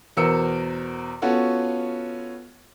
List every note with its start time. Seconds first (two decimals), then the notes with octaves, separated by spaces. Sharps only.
0.17 E2 B2 A#4 C5 E6 C#7
1.22 B3 C#4 F4 F#4 A4 C#5